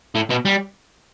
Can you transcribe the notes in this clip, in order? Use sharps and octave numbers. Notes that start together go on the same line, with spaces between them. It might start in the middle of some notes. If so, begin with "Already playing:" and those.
A2
B2
G3